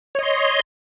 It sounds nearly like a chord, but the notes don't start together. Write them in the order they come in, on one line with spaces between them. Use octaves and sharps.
C#5 D#5 C6